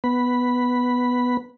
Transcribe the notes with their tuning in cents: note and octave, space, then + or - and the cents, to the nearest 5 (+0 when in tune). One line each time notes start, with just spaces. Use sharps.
B3 +0 B5 +0